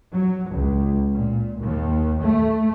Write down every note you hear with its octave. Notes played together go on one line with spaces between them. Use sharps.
F#3
C#2
A#2
D#2
A3